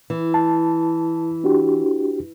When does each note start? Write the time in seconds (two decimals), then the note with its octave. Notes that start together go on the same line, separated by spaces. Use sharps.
0.10 E3
0.34 A5
1.44 D4 F#4 G4